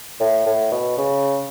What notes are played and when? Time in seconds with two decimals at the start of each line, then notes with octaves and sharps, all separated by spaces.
0.20 A2
0.46 A2
0.72 B2
0.98 C#3